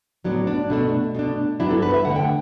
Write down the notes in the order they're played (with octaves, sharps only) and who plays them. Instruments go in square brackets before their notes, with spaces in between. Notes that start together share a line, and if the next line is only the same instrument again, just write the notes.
[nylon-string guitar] A2 F#3 B3 D4
D4
B2 A3 D4
B2 A3 D4
G2 F#3 B3 D4 E4
A4
B4
E5
E2 D3 A3 F#5
G5